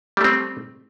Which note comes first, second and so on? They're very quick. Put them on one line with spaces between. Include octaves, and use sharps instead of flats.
G3 A3 C4